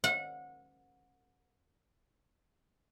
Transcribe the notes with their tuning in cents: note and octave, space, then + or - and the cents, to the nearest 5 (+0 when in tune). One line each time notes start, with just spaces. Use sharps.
F#5 -25